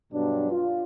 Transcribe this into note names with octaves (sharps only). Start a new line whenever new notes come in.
G2 B2 F#3 D4
F4